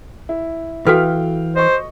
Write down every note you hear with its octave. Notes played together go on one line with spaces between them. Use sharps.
E4
E3 F#4 A4 B4 F5 G5 F6
C5 D#5 C#6